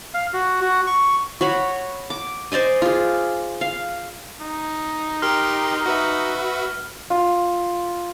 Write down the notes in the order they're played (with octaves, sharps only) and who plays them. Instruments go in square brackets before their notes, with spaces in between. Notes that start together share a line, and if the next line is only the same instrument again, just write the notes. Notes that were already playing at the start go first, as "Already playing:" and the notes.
[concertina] F5
F#4
F#4
C#6
[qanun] F#4 C#5 B5
D6
C5 D5 D#5 G#5
F4 G#4
F5
[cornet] D#4
[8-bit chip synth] G4 A#4 C6 [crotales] F6
[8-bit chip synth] F#4 B4 E5
[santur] F4